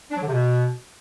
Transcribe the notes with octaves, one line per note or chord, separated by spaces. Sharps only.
D4
F#3
D3
C3
B2